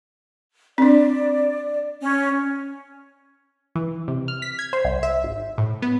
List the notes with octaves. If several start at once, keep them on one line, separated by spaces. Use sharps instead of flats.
C4 D4 D5
C#4
E3
C3
F6
B6
G#6
C5
C2
E5
G#1
A2
B3